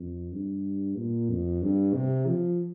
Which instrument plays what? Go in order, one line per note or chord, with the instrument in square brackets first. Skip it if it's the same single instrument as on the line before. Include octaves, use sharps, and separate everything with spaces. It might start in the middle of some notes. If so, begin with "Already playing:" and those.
Already playing: [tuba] F2
G2
A#2
F2
G2
C3
F3